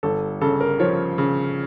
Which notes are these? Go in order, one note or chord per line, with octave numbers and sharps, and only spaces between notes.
G1 A4
C#3 A4
A#4
F3 C#5
C#3